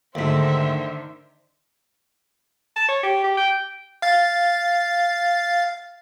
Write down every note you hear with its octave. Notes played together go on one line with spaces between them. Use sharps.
D2 G#2 D3 D#3 C5 E5
A5
C#5
G4
G4
G5
F5 A6